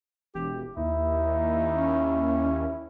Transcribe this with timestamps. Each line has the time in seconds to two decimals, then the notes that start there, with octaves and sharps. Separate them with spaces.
0.35 E1 G4
0.77 D#2 D#4 E4
1.71 C#4